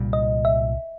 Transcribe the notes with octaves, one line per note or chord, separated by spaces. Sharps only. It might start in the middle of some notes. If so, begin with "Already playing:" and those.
Already playing: C2 A#2 G3
D#5
E5